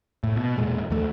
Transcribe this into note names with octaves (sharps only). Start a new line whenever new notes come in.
A2
B2
E1 A#2 G#3
D#2 A3